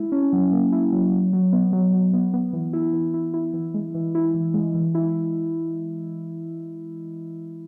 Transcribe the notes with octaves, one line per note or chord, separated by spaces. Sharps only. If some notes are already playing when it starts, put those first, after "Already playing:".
Already playing: G#3 E4
C#4
F#3
A#3
E4
F#3
F#3
F#3
B3
F#3
F#3
B3
B3
E3
E4
E3
E4
E4
E3
G#3
E3
E4
E3
G#3
E3
E4